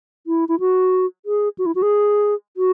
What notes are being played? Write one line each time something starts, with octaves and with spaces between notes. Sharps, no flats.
E4
E4
F#4
G#4
F#4
E4
F#4
G#4
F#4